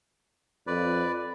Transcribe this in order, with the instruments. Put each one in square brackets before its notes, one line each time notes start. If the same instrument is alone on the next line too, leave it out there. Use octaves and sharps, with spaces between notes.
[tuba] F2 [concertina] B4 D5